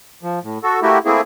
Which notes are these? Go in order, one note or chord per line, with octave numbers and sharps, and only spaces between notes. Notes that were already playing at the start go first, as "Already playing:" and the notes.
F3
A2
F#4 A4
A3 A#3 E4 F#4 G4
A3 A#3 C4 E4 G#4